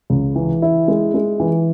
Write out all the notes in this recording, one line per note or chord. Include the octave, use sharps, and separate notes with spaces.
C#2
E3
E4
G#3
G#3
E3